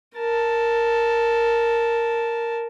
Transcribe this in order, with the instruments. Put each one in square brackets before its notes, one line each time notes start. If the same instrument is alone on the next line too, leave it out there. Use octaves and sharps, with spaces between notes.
[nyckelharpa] A#4 A5